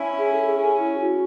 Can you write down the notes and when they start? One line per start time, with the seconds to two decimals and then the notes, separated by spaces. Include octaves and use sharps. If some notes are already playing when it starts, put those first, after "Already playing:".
Already playing: C#4 E4
0.18 G#4
0.33 A4
0.45 G#4
0.58 C#4 G#4
0.79 E4
0.99 F#4